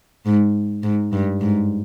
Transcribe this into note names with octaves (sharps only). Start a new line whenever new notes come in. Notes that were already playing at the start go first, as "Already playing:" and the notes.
G#2
G#2
G2
G#2